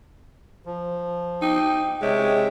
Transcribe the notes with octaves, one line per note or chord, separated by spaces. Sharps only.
F3
D#4 G5
C3 G#3 C#5 E5 G5